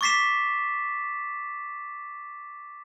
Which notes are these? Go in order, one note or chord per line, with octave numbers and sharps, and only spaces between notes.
C#6 D6 A6 B6 C7 E7